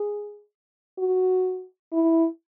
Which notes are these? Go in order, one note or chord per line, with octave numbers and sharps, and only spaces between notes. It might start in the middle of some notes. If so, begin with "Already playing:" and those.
Already playing: G#4
F#4
E4